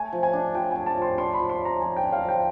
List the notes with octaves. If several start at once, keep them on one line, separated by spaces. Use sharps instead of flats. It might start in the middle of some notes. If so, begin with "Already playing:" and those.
Already playing: A3 G#5
F3
G#5
D4
F3 G5
A3 G#5
A5
F3 C6
D4 C6
B5
F3
C6
A3
A#5
F3 G#5
G5
D4
F5
F3
G5